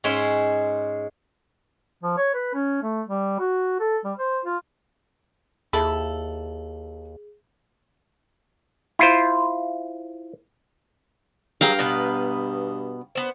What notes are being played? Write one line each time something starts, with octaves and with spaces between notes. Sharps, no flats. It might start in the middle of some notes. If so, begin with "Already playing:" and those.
G#2 G#3 C#4 G#4 E5 C6
F3
C#5
B4
C#4
A3
G3
F#4
A4
G3
C5
F4
D#2 E4 G#4 A4 F#7
E4 F4 C5
G2 F#3 G#4 F5 G5 A#5
B2 B3 B4
B3 C5